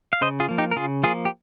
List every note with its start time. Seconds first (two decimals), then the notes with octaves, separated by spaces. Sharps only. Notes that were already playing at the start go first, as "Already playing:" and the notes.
0.13 F5
0.21 C#3 C5 D#5
0.40 F4 G#4
0.49 F3 A#3
0.58 D#4 G4
0.71 A#4
0.76 C#3 F4 G#4
1.03 F3 A#3 F4 G#4
1.25 G4